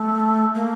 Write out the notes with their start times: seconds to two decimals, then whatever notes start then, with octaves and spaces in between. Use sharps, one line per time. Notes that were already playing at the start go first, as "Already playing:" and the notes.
Already playing: A3
0.55 A#3